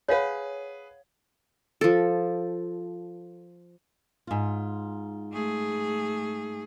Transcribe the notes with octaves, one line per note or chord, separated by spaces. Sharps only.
G#4 B4 C#5 F5 F#5
F3 A4
G#2 F4
A3 G#4